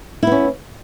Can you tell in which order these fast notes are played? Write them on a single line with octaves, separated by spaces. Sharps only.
E4 B3 C#4